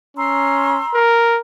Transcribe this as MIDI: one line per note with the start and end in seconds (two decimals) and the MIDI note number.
0.17 0.81 61
0.17 0.98 82
0.17 0.98 84
0.17 0.98 88
0.95 1.40 70